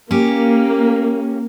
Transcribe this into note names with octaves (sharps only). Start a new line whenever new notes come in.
A#3 C#4 G4